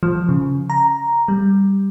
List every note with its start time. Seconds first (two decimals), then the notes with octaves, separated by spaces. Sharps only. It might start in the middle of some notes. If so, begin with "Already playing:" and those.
0.03 F3
0.29 C#3
0.70 A#5
1.28 G3